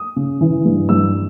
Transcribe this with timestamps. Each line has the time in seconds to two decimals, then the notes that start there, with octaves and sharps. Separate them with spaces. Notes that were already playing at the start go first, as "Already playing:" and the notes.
Already playing: D#6
0.16 C#3
0.41 E3
0.65 G2
0.89 G2 E6